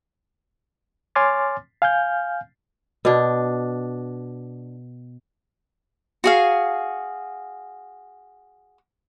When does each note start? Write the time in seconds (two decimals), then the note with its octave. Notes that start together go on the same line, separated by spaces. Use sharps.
1.15 C#5 G#5 C6 D6 F6 A6
1.82 F5 G#5 F6 G6
3.05 B2 D4
6.24 F#4 G#4 F5